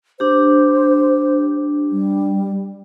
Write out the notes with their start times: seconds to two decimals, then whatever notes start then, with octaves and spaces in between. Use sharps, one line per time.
0.20 D4 G4 C5
1.91 G3